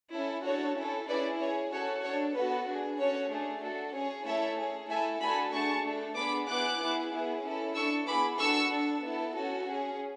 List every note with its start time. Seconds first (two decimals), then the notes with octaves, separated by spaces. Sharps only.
0.14 C#4 E4 A4
0.46 D4 F#4 A4 C#5
0.78 C#4 E4 A4
1.09 C#4 E4 G#4 B4 D5
1.41 C#4 G#4 C#5
1.72 C#4 F#4 A4 C#5
2.04 D4 A4 C#5
2.36 B3 F#4 A4 B4
2.68 D4 G#4
3.00 C#4 F#4 A4 C#5
3.31 A3 D4 G#4
3.63 D4 F#4 A4
3.95 C#4 G#4 C#5
4.27 A3 E4 A4 C#5 E5
4.59 C#4 G#4
4.90 A3 E4 A4 E5 G#5
5.22 A3 D4 F#4 A4 G#5 B5
5.53 A3 D4 G#4 A5 C#6
5.85 A3 D4 A4
6.17 B3 D4 G#4 B5 D6
6.49 B3 E4 G#4 D6 F#6
6.81 B3 E4 G#4
7.12 B3 E4 G#4
7.44 C#4 E4 A4
7.76 D4 A4 C#6 E6
8.08 B3 E4 G#4 B5 D6
8.39 D4 F#4 A4 C#6 E6
8.71 D4 A4
9.03 B3 E4 A4
9.35 C#4 F#4 A4
9.66 C#4 G#4